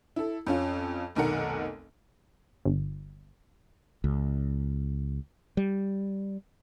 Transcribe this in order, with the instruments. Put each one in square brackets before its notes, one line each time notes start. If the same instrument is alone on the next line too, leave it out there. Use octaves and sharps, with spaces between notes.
[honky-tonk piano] E4 A4
F2 C#4 F4
F1 B1 D#3 A4 A#4 F#5
[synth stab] G1
[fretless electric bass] C#2
G3